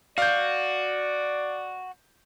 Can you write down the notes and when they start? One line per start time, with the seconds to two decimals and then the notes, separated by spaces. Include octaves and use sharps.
0.18 F#4 D5 F5 G6